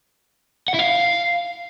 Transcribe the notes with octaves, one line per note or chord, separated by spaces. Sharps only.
F#5
E4
F5